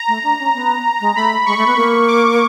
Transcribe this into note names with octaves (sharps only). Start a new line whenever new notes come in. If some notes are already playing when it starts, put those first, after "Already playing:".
Already playing: A#5
A3
D4
C#4
B3
G#3
A3 B5
G#3 C#6
A3
B3
A#3
D6